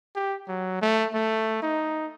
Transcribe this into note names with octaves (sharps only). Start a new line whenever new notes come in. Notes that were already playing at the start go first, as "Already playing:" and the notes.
G4
F#3
A3
A3
D#4